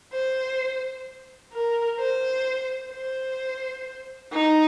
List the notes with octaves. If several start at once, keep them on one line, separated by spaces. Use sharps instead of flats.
C5
A#4
C5
C5
D#4